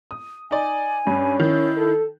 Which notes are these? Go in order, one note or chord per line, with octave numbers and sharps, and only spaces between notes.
D#6
D#4 D5 G#5
G2 C#4
D#3 E4
A4